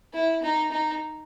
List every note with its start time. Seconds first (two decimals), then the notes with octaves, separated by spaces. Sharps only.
0.14 E4
0.42 D#4
0.71 D#4